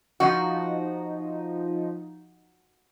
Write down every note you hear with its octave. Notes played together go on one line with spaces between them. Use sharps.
F3 D#4 F#4